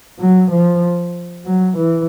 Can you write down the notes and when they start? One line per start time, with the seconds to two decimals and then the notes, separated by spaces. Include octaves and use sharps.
0.19 F#3
0.51 F3
1.45 F#3
1.77 E3